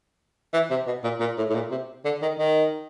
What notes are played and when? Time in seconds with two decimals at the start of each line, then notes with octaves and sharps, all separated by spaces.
0.53 E3
0.70 C3
0.87 B2
1.04 A#2
1.20 A#2
1.38 A2
1.50 A2
1.54 A#2
1.71 C3
2.05 D3
2.22 D#3
2.39 D#3